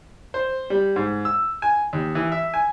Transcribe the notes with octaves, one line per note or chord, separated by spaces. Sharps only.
C5
G3
G#2
E6
G#5
D#2
E3
E5
G#5